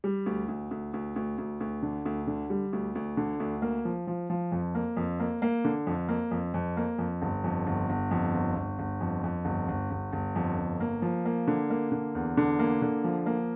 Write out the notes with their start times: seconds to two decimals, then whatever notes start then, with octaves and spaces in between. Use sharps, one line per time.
0.04 G3
0.26 D2
0.49 D2
0.71 D2
0.94 D2
1.16 D2
1.38 D2
1.60 D2
1.83 D3
2.05 D2
2.27 D3
2.50 G3
2.73 D2
2.95 D2
3.17 D3
3.40 D2
3.62 A#3
3.85 F3
4.07 F3
4.30 F3
4.52 F2
4.75 A#3
4.97 F2
5.20 A#3
5.42 A#3
5.64 D3
5.87 F2
6.09 A#3
6.31 F2
6.54 F2
6.77 A#3
6.98 F2
7.22 G1
7.44 F2
7.67 G1
7.89 G1
8.11 F2
8.34 G1
8.55 G1
8.79 G1
9.01 F2
9.24 F2
9.45 G1
9.68 G1
9.91 G1
10.13 G1
10.36 F2
10.58 G1
10.80 A#3
11.02 F3
11.25 A#3
11.47 D3
11.70 A#3
11.92 D3
12.15 E2
12.37 D3
12.59 A#3
12.82 D3
13.04 F3
13.26 A#3